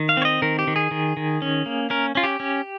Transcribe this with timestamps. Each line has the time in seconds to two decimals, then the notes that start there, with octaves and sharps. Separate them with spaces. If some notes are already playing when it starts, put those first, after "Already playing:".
Already playing: D#3
0.09 F5
0.17 C4 C#5
0.25 D#5
0.42 D#3 A#4
0.59 G4
0.67 D#3
0.76 G#4
0.91 D#3
1.17 D#3
1.42 C#4
1.66 A#3
1.90 C#4 A#4
2.15 C#4 F4
2.23 G4
2.40 C#4